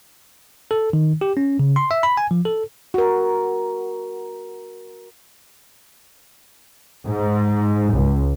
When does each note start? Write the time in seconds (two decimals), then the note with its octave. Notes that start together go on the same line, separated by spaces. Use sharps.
0.71 A4
0.93 D#3
1.21 G4
1.37 C#4
1.59 C#3
1.76 C6
1.91 E5
2.03 B5
2.17 G#5
2.31 F3
2.45 A4
2.94 F#4 A#4
7.07 G#2
7.94 C#2